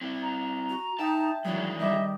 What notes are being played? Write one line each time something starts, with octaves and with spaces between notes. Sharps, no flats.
C4 E4
A#5
F#4
D#4 E5 G5 A5
G2 D#3 E3 F#3 G#3 D4
D#3 G3 D#5 E5